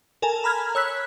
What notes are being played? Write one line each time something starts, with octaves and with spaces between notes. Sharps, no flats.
A4 A#4 G#5 A5
A#5 B5 F6 G#6
C#5 E6 F#6 B6